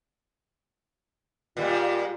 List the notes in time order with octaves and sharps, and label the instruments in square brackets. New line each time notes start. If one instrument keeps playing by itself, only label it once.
[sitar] A#2 G3 G#3 [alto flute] F4